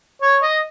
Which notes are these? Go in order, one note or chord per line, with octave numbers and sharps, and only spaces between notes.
C#5
D#5